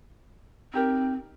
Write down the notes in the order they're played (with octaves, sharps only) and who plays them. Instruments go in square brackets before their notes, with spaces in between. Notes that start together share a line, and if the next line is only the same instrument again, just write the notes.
[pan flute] C4 [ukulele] D#4 G4 A#4